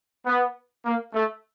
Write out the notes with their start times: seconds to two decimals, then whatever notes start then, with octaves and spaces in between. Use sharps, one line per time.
0.25 B3
0.84 A#3
1.14 A3